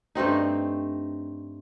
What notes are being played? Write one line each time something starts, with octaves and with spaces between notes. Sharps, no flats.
G2 A3 C4 D#4